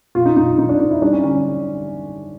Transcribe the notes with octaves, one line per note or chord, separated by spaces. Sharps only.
B2 F4
D#4
B2 D#4
B2 D#4
D4
C4 D#4
E4
G3 D4
C#4
D3 C#4